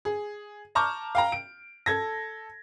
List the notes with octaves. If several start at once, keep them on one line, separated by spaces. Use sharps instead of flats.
G#4
A5 A#5 C#6 D6 F6 G6
F5 G5 A#5
D7
A4 G#6 A#6